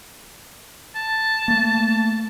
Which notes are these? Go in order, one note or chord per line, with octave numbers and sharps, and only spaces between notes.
A5
A3 A#3